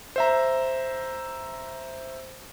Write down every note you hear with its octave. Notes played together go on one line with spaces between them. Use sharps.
C5 E5 A#5